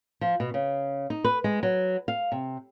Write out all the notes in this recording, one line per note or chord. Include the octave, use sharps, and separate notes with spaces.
F3
B2
C#3
D#4
B4
G#3
F#3
F5
C3